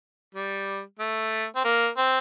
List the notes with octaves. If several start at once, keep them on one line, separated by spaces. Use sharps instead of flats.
G3
A3
C4
A#3
C4